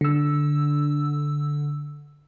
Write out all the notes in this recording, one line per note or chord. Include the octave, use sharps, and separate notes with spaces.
D3 E6